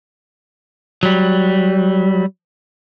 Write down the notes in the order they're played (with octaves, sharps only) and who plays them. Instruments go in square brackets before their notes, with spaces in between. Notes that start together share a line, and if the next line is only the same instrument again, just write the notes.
[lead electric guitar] F#3 G3